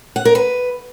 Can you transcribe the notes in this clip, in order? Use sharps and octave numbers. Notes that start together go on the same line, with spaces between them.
F#5
A#4
B4